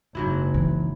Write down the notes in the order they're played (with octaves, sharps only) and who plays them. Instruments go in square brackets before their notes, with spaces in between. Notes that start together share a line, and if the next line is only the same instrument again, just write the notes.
[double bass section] F#1 [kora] G#2 F#3 E4
[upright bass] E3